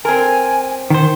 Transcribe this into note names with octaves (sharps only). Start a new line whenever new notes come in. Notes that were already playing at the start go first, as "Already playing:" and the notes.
C4 A#4 G#5
D#3 C5